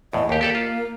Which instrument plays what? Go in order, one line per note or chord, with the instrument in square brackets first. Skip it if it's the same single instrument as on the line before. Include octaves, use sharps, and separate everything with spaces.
[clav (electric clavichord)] E2 A2 [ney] D#5
[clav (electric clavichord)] D#2 G4 [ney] A#3
[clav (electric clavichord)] G4 A4 D5
F4